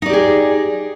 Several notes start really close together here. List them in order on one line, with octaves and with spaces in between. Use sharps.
D#4 D5 G4 G#4